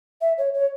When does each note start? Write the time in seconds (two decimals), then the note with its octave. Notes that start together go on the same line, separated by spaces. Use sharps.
0.21 E5
0.38 C#5
0.54 C#5